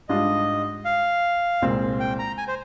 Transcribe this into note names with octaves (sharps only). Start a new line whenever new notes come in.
G#2 G3 D4 F4 D#5
F5
C2 A#2 G#3 C4
G5
A#5
G#5
C5